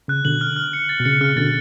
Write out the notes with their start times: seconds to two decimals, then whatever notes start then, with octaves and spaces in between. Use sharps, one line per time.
0.08 C#3 F#6
0.25 B2 D3 F#7
0.41 F6
0.56 F6
0.73 C#7
0.89 A6
1.00 B2
1.05 C#3 C#7
1.21 C#3 F6
1.36 B2 D3 A6